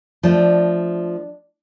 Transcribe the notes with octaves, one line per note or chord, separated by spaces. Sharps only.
F3 A3 D4 D#5